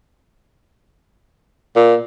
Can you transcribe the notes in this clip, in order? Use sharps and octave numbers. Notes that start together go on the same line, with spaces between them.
A#2